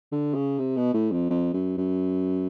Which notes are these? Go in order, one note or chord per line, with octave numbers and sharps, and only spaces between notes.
D3
C#3
C3
B2
A2
F2
F2
F#2
F#2